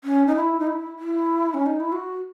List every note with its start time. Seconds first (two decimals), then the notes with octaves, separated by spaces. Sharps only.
0.04 C#4
0.27 D#4
0.36 E4
0.60 D#4
0.67 E4
0.99 E4
1.54 C#4
1.66 D#4
1.80 E4
1.92 F#4